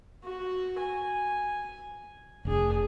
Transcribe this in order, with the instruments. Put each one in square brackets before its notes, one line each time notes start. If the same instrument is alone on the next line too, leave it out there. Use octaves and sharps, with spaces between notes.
[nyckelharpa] F#4
G#5
[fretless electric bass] F1 [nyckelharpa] D4 G#4